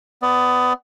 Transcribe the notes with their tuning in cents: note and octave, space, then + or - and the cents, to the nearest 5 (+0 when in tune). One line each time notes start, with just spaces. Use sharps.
B3 +20 D5 +0